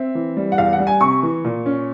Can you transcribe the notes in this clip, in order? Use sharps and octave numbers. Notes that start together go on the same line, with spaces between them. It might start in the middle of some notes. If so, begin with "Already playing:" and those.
Already playing: C4 E5
E3
G3
F#5
E2 F5
F#5
G3
G#5
C3 C#6
E3
A#2
C#4